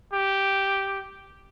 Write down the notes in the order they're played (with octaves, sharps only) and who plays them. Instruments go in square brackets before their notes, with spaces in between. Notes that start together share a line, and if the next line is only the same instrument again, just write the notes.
[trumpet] G4